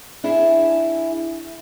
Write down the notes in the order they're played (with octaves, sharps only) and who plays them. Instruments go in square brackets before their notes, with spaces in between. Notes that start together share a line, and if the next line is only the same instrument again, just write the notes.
[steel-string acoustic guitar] D4 E4 G#4